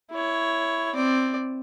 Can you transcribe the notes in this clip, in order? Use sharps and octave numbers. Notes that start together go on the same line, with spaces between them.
E4 C#5
C4 D5